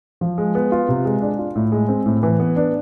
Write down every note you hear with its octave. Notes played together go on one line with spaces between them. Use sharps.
F3
G#3
B3
F4
C3
G#3
D4
F4
A2
G#3
C4
A2
E3
B3
D4